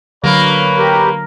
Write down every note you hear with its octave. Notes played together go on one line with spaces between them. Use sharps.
D3 F#3 A#3 B4 C#5 B5
G4 A#4